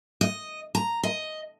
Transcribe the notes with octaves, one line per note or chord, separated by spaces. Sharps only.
D#5
A#5
D#5